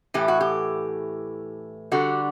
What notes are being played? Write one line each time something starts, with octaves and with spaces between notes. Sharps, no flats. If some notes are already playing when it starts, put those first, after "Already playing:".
A2 E3 A3 G4
F#4
G4
D3 G3 F#4